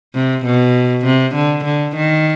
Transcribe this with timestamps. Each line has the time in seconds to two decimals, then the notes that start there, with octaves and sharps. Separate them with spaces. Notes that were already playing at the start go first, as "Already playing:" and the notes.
0.15 C3
0.46 B2
1.06 C3
1.35 D3
1.65 D3
1.96 D#3